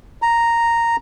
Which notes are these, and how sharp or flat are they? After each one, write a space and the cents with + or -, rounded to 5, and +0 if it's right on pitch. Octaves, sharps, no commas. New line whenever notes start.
A#5 -5